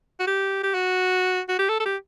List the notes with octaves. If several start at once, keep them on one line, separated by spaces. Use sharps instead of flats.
F#4
G4
G4
F#4
F#4
G4
A4
A4
G4